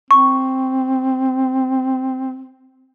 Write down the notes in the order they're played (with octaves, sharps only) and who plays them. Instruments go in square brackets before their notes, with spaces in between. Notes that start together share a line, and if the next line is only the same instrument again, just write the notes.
[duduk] C4 [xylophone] C#6